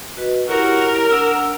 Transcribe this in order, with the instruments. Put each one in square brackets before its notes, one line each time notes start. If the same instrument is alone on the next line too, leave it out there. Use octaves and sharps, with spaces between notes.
[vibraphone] F#4 B4 D#5
[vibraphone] E4 G4 C#5 [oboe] F#4 [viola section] A#4
[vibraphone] D4 F#5 [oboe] E6